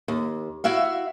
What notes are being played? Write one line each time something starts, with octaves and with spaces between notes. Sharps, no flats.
D#2
E4 F#4 E5 F5